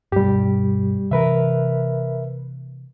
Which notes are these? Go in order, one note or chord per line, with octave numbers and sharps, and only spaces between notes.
G2 B2 G3 G4
C3 E3 A#4 B4 E5